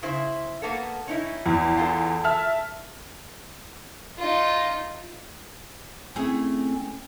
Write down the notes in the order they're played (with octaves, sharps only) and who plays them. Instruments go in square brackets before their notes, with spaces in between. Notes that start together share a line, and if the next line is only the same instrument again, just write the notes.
[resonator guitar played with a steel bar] C#3 E4 C5
A#3 B3 A4
C#4 D#4 E4
[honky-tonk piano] E2
[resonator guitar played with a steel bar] F4 G#4 A4
[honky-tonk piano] E5 A5 F6
[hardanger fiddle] D#4 F4
[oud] A3 E4 G#4 [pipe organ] C4 C#4